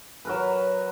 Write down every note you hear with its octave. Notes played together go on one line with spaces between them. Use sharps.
F#3 A#4 B4